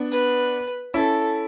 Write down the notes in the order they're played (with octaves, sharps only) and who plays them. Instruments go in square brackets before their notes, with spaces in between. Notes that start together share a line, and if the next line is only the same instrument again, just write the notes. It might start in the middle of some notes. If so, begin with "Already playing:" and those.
Already playing: [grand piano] B3 D4
[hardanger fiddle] B4
[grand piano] C#4 E4 [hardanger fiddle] A4